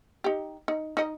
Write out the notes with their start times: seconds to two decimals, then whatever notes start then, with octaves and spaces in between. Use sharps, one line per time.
0.24 D#4 G4
0.68 D#4
0.97 D#4 D#5